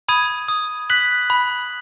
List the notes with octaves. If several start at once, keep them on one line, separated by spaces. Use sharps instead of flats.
B5 D#6 G#6 D#7
D#6
F#6 B6 F#7
B5